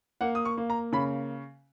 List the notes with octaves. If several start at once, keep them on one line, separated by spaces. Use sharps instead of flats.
A#3 F#5
D#6
C#6
A#3
A#5
C#3 B5